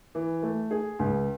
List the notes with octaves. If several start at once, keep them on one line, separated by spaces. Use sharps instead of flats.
E3
A3
G#4
C#2